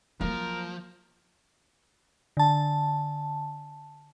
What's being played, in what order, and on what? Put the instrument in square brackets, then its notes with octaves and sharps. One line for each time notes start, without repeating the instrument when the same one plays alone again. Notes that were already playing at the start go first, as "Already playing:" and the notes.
[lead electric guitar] F3 [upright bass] F#3 A#3 [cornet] A#4
[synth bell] D3 A5